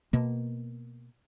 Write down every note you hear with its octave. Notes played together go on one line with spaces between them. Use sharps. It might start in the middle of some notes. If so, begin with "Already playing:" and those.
B2 A#3